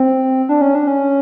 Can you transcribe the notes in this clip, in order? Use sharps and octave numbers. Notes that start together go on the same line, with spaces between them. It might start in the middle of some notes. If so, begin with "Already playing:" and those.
Already playing: C4
D4
C#4
D4
C#4